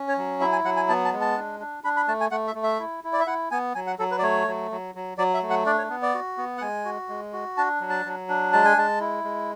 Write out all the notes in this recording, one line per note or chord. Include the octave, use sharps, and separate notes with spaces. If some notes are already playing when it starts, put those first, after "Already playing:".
Already playing: C#4
C#5
F#3
E4 E5
G#5
F#3 F#5
G#5
B3 A5
A5
G#3
A5
D4
D4
D4 B5
B5
A3 A5
G#5
A3 F#5
E5
A3
E5
E4
E4
D5
E5
E4 F#5
B3 G#5
F#3 G#5
F#5
F#3 A4
B4
D5
A3 C#5
F#3
F#3
F#3
F#3 D5
E5
A3
F#5
D4 D5
C#5
B3
D5
F#4
B3
F#5
G#3 G#5
F#4
G#3
F#4
D4 A5
F#3
A5
F#3
D4
G#3 A5
G#5
G#3 A5
E4
G#3